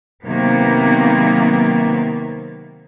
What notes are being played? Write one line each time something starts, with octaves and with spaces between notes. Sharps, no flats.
C3 D#3 F#3 A#3 B3